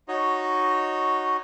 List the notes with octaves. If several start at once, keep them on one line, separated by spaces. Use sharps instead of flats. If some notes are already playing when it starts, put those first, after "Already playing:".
D#4 F#4 C#5 D#5